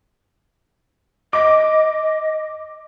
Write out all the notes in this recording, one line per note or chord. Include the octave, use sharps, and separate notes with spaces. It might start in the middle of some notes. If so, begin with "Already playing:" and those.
D#5 D6